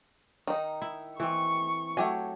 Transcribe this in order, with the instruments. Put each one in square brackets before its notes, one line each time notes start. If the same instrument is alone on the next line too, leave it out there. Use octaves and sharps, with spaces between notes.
[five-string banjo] D#3 D#4
[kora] E4
[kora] E3 C4 [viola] C#6
[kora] F#3 [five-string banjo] A3 G4 G#5